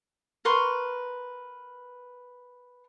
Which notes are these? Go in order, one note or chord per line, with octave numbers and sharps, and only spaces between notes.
A#4 B4 C6 C#6